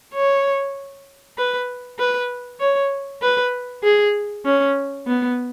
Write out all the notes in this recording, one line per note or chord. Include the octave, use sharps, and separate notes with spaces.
C#5
B4
B4
C#5
B4
G#4
C#4
B3